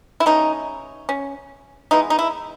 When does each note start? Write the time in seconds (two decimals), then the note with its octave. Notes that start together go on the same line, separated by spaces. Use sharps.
0.20 E4
0.26 B2 A3 C#4 D#4
1.09 C#4
1.91 E3 G#3 B3 D#4
2.10 D#4
2.19 E4